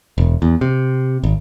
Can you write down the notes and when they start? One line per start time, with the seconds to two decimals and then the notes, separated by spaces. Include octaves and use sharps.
0.18 E1
0.42 E2
0.61 C3
1.23 G#1